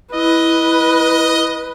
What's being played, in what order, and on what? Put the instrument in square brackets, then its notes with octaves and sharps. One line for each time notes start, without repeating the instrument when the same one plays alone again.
[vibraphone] E4 [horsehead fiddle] B4 [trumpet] D#5